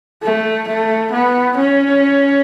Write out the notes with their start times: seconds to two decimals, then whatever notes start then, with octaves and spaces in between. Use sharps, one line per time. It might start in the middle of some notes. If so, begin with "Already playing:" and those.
0.22 A3
0.68 A3
1.12 B3
1.57 C#4